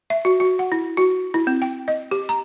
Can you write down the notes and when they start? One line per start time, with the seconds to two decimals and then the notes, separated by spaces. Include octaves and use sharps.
0.10 E5
0.25 F#4
0.40 F#4
0.59 F#5
0.72 E4
0.97 F#4
1.34 E4
1.47 C4
1.62 G5
1.88 D#5
2.11 G4
2.29 A#5